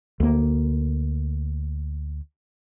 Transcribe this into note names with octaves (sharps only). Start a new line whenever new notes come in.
D2 A#3